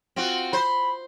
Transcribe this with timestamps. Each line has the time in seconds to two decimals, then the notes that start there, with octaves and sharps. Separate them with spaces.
0.16 C4 F4 F#4
0.53 C5 B5